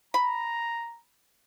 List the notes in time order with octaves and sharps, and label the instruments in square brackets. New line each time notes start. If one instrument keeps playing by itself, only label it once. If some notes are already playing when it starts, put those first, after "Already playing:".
[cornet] A#5 [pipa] B5